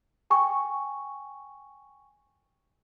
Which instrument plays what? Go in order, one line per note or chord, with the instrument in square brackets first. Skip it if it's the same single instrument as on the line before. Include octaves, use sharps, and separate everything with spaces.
[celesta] G5 G#5 C#6